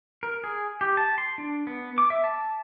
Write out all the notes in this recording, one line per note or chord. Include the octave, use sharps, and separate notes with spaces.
A#4
G#4
G4
A5
C6
D4
B3
D6
E5
A5